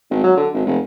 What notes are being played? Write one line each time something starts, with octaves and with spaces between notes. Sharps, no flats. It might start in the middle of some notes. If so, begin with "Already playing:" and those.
G#1
F#3
D3
G#1
F1